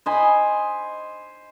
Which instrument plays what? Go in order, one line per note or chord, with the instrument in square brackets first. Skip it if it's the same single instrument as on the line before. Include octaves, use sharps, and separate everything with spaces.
[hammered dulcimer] C5 D#5 G#5 B5